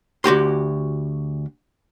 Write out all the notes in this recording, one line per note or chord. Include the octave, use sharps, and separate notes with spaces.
D2 F#4 G4 C6